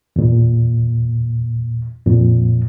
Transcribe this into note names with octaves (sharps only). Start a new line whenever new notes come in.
E2 A#2
F2 A#2